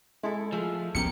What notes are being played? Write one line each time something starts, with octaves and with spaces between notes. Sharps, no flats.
G#3 E4 A4
F3 A3 G#4
F2 B3 C#4 G4 A#4 C#7